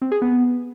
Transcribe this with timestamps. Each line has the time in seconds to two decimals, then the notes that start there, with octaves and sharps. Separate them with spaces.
0.02 C4
0.12 G#4
0.22 B3